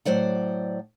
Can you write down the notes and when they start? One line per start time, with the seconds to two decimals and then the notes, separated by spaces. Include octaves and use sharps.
0.05 A2 F#3 C5 D5 F#5